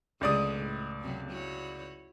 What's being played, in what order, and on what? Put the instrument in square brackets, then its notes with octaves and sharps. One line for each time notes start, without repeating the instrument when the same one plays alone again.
[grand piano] C#2 D5 D#6 [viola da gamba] D3 G#3 A3
[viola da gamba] A2
F#2 C3 F#3
E4 F#4 C#5